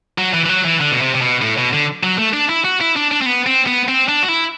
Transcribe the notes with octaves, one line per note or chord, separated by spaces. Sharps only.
F#3
E3
E3
F#3
E3
D3
B2
C3
C3
B2
A2
B2
D3
F#3
A3
D4
E4
F#4
E4
D4
D4
C4
B3
C4
B3
C4
D4
F#4
E4